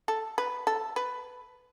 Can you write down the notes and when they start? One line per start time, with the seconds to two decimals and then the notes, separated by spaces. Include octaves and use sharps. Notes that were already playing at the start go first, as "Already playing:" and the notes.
0.08 A4
0.38 B4
0.67 A4
0.96 B4